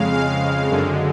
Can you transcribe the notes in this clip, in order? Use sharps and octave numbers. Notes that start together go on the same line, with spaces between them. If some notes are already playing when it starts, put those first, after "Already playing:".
Already playing: F2 C#3 G#3 F5
F5
F#2 D3 G#3